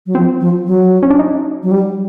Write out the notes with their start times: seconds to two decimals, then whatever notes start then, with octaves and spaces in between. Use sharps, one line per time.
0.06 F#3
0.15 F3 C4
0.41 F3
0.67 F#3
1.03 C#4
1.10 D4
1.19 D#4
1.63 F#3
1.71 G3